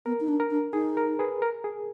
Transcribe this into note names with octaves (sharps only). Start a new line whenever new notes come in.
B3 A#4
D#4
D4
A#4
D4
D#4 G#4
A#4
G#4 B4
A#4
G#4